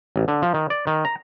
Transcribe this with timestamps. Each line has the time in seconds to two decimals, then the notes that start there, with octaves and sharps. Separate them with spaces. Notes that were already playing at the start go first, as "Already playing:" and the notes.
0.16 A1
0.28 D3
0.42 F3
0.54 D#3
0.70 D5
0.87 D#3
1.05 A#5